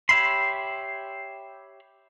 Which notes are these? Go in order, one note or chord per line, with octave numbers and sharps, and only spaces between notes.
G4 C#5 E5 B5 C6